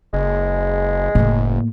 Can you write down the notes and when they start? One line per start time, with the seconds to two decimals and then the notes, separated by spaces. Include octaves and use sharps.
0.13 F#1 G#3
1.15 F#1 A2 A#3